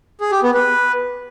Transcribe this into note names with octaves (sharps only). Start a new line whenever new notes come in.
G#4
G4
B3
B4